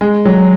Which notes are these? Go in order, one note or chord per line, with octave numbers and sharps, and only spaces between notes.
G#3
F#3